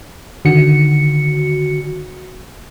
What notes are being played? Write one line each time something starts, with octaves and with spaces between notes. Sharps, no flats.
D3 D#3 F#4 C#7